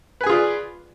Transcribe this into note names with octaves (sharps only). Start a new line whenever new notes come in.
F4 G#4 B4 D5 G#5